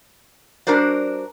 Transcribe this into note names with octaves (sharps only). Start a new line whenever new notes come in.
G3 D4 F#4 A#4 C5 D5